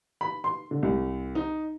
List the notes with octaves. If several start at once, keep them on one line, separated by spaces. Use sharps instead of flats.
B5
C6
D3
C2
D#4